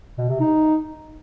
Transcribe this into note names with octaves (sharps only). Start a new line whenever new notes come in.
B2
C3
D#4